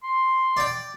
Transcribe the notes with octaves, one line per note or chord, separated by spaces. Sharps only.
C6
D5 G5